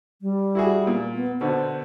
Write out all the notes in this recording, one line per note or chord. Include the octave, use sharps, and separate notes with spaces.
G3
E4 F#4 G#4
A#2
B3
B2 D3 C5